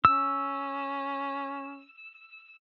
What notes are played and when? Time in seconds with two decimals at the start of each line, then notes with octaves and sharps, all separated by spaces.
0.05 C#4 E6